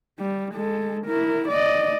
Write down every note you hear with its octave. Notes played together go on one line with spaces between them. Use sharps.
G3
G#3 A4
E4 A#4
D5 D#5